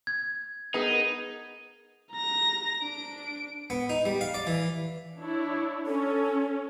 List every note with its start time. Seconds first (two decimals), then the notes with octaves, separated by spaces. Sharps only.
0.07 G#6
0.74 B3 D#4 G#4 A#4
2.12 A#5 A#6
2.82 D4 D7
3.70 B3
3.89 D#4
4.05 G3
4.21 F5
4.34 D5
4.47 E3
5.18 D4 E4 C#5
5.87 C#4 A4